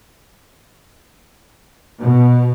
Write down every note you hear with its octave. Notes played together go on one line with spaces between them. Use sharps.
B2